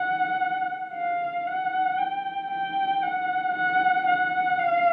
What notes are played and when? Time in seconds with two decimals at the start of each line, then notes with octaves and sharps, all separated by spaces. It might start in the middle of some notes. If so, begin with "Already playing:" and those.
Already playing: F#5
0.93 F5
1.46 F#5
1.98 G5
2.51 G5
3.03 F#5
3.55 F#5
4.07 F#5
4.59 F5